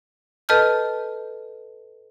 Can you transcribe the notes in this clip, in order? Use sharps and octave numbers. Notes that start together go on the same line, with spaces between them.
A4 B4 D#5 A5 F6 G6